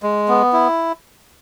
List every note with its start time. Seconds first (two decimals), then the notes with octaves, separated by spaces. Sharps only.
0.03 G#3
0.28 B3
0.53 E4